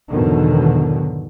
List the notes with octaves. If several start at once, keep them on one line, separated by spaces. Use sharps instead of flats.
E2 G#2 B2 D3 D#3 F#3